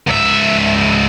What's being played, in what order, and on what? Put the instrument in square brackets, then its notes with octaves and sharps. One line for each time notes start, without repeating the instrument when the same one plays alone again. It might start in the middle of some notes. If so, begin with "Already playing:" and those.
[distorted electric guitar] C#2 E5